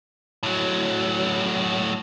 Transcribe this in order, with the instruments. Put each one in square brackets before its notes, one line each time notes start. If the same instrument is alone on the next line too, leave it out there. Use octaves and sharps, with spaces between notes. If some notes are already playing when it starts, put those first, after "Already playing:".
[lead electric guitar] A2 F#3